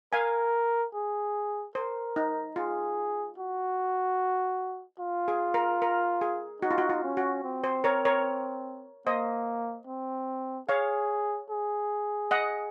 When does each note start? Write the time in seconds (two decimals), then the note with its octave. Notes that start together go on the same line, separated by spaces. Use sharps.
0.13 A#4 F5 G#5
0.94 G#4
1.75 A#4 C5
2.16 D#4
2.56 F4 G#4
3.38 F#4
5.00 F4
5.28 G#4
5.54 A#4
5.82 A#4
6.21 G#4
6.62 D#4 F#4
6.71 F4
6.78 F#4
6.90 F4
7.03 C#4
7.17 F#4
7.44 C4
7.64 C5
7.84 A#4 C#5
8.05 A#4 C#5
9.07 A#3 C5 D#5
9.87 C4
10.69 G#4 C#5 F5
11.50 G#4
12.31 D#5 F#5